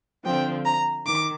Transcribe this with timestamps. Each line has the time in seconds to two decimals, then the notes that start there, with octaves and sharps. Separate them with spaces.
0.25 D3 F3 C4 G5
0.65 A#5
1.06 D#3 D6